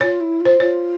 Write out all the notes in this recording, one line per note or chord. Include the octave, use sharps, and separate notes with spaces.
F4 C#5
E4
F4
C5
F4 C#5